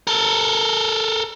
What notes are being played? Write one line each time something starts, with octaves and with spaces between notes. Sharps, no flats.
A4 A#4